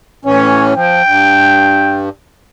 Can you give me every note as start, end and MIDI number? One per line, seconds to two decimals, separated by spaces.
0.25 0.74 45
0.25 0.74 52
0.25 0.74 61
0.25 0.73 73
0.75 1.02 53
0.75 2.03 79
1.07 2.09 43